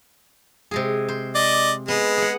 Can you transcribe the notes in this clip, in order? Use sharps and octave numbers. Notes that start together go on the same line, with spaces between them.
C3 G#3 G#4
C5
D5 D#5
G#3 B3
G#4 F#5